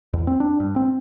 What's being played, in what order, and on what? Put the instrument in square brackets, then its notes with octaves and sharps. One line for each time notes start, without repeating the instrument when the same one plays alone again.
[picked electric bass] E2
C4
D4
G2
C4